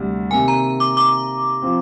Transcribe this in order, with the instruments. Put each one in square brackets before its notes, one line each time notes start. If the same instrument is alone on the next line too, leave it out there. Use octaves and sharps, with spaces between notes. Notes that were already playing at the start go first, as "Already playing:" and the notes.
Already playing: [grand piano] D2 C3 G3
[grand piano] C3 D#3 A#3 [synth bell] G#5
[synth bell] A#5
D6
D6
[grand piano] F3 C4